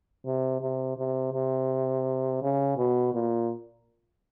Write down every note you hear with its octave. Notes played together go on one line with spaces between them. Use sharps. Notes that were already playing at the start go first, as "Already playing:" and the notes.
C3
C3
C3
C3
C#3
B2
A#2